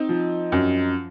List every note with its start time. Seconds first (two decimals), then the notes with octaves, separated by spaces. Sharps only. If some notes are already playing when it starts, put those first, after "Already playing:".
Already playing: C4 D#4
0.09 F3
0.52 F#2